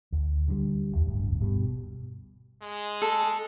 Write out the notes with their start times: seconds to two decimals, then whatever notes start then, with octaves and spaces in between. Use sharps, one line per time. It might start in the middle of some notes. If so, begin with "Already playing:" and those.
0.12 D2
0.48 D3 E3 G3
0.92 A#1 D#2
1.05 D1 G1 D2
1.40 G2 B2 G3
2.62 G#3
3.02 A4